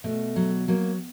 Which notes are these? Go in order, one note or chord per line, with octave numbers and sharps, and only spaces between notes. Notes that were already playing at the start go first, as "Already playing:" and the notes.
B2 A3
F#3
F#3 A#3